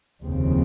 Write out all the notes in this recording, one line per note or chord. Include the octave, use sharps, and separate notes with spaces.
F1 D#2 C#3 F3 C4